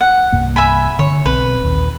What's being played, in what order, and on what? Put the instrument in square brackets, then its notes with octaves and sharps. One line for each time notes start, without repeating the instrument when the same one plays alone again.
[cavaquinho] F#5
[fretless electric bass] C2 G2 A#3
[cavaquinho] E5 G#5 B5
[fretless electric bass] D3 [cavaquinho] C#5
[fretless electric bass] B1 C4 [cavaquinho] B4
[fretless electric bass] A#1 D#2